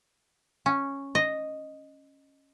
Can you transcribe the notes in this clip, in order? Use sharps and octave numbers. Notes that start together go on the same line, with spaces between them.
C#4
D#5